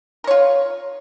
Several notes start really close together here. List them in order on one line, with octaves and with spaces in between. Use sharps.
A#4 C#5 F4